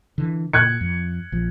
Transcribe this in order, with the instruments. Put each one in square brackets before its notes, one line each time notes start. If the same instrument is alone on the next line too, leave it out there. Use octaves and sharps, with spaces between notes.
[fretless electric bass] D3 E3
[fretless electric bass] A#2 [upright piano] F#6 G#6 C#7
[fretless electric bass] F2
A#1 F3